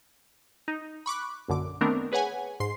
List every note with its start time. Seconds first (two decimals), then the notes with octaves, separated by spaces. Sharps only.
0.68 D#4
1.06 B5 C#6 D6 F#6
1.48 A#1 F#2 D3 D6
1.81 D#3 A3 B3 C4 D4 A#4
2.12 G#4 B4 C#5 F#5 G#5
2.60 G#2 C6 C7